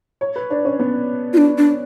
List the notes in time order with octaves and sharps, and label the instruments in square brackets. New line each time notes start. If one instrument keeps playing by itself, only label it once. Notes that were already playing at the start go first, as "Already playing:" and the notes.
[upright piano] C#5
B4
D4
C#4
B3
[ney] F4
D4
D4